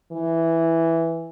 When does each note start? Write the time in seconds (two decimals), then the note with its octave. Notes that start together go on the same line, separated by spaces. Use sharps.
0.12 E3